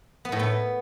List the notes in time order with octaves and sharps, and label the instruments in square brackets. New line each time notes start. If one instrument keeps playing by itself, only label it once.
[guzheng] B3
A2
B3